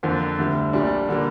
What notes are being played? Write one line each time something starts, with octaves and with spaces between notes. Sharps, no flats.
F2 D3 A#3 F4 C5
D2 D3 G3
A#1 A#2 G3 D4
D3 G3 A#3